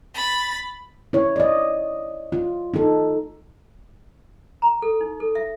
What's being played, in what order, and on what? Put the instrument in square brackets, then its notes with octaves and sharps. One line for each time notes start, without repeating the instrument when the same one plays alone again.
[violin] B5 A6
[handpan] E4 C#5
D5 D#5
F4
D#4 A4
[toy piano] A#5
A4
D#4
A4
E5